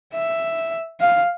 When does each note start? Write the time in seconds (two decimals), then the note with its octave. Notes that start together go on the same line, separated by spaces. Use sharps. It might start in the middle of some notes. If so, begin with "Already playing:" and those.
0.14 E5
1.01 F5